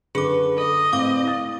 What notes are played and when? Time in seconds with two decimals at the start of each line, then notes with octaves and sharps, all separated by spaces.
0.15 F#2 D3 G#4 B4 D6
0.58 A4 D#5
0.93 A2 C4 F5 D6
1.24 E4 A6